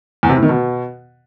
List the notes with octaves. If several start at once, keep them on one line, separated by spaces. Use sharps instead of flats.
E2
C3
A2
D#3
B2